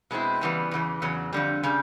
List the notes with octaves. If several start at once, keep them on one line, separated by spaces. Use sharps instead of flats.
B2 G#3 C4 E4
C#3 E3 G3 B3
E2 C#3 E3
E2 C#3 F#3
F2 D3 G3
C#3 G3